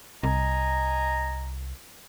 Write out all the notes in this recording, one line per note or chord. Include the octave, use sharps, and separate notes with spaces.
C2 D#5 G#5 A#5